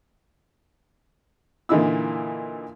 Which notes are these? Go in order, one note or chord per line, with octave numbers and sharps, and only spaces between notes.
A#2 D3 E3 D#4 E4 E6